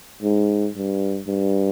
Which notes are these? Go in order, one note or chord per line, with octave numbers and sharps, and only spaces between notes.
G#2
G2
G2